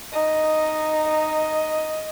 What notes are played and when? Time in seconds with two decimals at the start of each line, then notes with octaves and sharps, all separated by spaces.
0.13 D#4 D#5
1.08 D#5